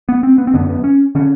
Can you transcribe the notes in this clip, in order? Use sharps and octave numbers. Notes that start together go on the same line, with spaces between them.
B3
C4
B3
C4
F#2 D3 B3
B3
C#4
D3 C#4